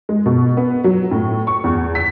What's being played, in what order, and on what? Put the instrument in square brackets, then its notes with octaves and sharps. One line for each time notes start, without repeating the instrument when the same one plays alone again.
[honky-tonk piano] G#3
B2
B3
F#3
A2
C#6
E2
B6